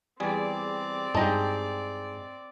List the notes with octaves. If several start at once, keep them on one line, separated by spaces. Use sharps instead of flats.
E2 G3 C4 G#4 D5
G2 G#3 D#4 G4 D#5 A5